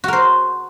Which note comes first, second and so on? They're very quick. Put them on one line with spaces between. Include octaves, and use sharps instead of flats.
F#4 A#4 C5